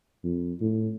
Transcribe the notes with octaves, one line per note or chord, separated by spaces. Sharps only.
F2
A2